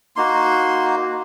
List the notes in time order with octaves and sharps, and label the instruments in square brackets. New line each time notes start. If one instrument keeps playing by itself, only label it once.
[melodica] A#3 D#4 F#4 C6